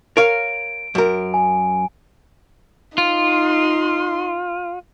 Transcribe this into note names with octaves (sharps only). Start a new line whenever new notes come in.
A#4 C#5 F5 D7
F#2 A#4
G#5
D#4 F4 C6